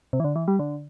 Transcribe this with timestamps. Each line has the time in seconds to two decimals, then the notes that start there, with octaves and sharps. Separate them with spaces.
0.13 C3
0.20 E3
0.24 D3
0.36 E3
0.48 G3
0.59 D3